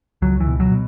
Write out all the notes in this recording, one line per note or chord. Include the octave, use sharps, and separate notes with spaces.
C#2 F#3
E3
B2
F#3
B2